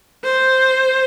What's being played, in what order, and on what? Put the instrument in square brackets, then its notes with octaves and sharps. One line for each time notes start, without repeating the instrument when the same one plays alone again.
[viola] C5